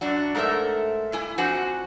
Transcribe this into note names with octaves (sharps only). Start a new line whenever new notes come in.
F#2 D4 F#4
G#2 A3 A#4 C5 E5
G2 E4 G#5
F2 D4 F#4 C5 F#5 G#5